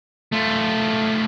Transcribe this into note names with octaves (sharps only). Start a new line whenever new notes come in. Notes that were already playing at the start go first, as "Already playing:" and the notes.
A3 F4